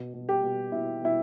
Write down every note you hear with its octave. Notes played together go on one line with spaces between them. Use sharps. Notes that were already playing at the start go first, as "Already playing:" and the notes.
Already playing: B2
B2
G4
B2
B2 E4
B2 E4